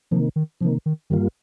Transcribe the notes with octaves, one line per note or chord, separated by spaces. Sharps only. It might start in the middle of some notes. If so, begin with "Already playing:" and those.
C3 D#3 F3 A#3
D#3
C3 D#3 F3 A#3
D#3
G2 D#3 G3 A#3 F4